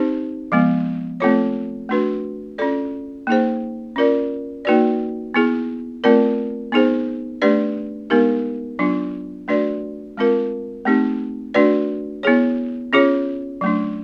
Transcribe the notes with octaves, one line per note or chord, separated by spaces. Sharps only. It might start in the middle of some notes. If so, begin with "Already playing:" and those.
Already playing: C4 D#4 G4 C5
F3 G#3 B3
A3 C4 F4 A4 C#5
A3 D4 F#4 B4
C#4 F4 A4 D5
A#3 D#4 G#4 C5
C#4 F4 A#4 D5
A#3 D#4 F#4 B4 D5
B3 E4 G#4
A3 C4 F4 A#4 D5
B3 D#4 G#4 C5
A3 D4 G4 B4 D5
G#3 B3 D#4 G4 A#4
F#3 B3 D4 F4
A3 D4 F#4 B4 D5
G#3 C4 F4 A#4
A3 C4 D#4 G4
A3 D4 F#4 B4 D5
B3 E4 G#4 C#5
C#4 F4 G#4 C#5
F#3 A3 D4